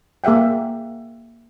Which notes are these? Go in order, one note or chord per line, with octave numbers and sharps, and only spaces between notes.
A#3 G#4 E5 F#5 G5